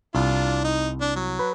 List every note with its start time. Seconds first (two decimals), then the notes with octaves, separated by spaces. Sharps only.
0.15 C2 D4 F4
0.64 D#4
1.01 D4
1.16 F#3
1.39 B4